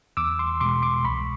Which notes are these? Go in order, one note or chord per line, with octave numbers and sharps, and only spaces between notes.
E2 D6 E6
C6 D6
B2 G#3 C6 D6
C6 D6
C2 B5 C#6